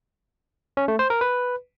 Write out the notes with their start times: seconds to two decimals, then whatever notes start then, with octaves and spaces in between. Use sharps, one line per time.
0.77 C#4
0.88 A3
0.99 C5
1.10 A#4
1.21 B4